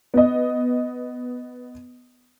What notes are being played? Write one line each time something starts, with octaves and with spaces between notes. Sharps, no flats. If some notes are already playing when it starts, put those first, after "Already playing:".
B3 D#5